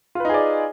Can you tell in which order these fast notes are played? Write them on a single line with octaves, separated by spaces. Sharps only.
F4 B4 D#4 G#4 D5